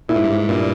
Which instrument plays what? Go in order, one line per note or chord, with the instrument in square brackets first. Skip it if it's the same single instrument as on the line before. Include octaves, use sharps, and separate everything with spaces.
[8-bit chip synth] A#2 [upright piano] E4
[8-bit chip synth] G#2
G2
G#2
G2 A#2